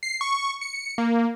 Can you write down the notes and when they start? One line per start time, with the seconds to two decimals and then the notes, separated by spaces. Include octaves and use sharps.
0.03 C7
0.21 C#6
0.61 C#7
0.98 A#3